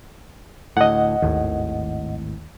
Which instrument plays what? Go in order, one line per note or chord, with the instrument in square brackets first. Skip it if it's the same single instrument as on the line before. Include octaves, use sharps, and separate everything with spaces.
[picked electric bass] D2 A2 [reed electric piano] D#5 F#5
[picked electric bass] G#1 A2 [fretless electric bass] D#2